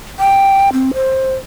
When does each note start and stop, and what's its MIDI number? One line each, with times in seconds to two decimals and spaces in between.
0.19 0.72 79
0.73 0.91 60
0.94 1.36 72